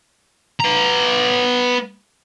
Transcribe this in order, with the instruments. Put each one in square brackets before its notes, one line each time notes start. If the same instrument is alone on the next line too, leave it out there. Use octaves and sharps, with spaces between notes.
[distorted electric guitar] B3 A#5